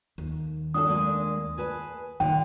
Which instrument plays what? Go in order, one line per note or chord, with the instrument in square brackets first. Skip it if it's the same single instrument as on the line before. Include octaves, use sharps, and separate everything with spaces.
[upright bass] D#2
[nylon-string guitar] D4 F#4 A4 [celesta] D#6
[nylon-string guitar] G#3 A#3 D4
G#4 B4 A5
[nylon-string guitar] A#2 D3 [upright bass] D#3 [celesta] G5